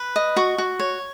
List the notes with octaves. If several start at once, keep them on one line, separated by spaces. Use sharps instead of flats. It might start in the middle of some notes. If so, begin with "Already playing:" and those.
Already playing: B4 B5
D#5
F#4 C#6
F#4
C#5